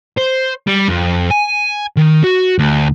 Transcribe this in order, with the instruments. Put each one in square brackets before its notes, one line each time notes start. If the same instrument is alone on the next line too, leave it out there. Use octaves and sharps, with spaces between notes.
[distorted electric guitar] C5
G3
F2
G#5
D#3
F#4
D2